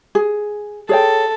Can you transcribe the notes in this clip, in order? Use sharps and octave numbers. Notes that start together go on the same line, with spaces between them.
G#4
G#4 A4 C#5 G5